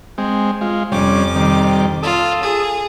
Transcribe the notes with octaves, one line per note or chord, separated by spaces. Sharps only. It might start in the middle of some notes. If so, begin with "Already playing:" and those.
G#3 C4
G#3 F4
F2 C3 G3 C#4 D6
C3 D#3 G3
F4 A4 D#6
G#4